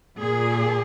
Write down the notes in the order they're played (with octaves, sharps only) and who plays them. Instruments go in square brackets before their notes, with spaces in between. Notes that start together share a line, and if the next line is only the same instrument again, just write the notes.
[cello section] A#2 A#3 G#4